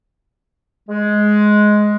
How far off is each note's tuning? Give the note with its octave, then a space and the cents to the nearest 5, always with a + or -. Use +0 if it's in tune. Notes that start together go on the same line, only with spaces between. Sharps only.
G#3 +10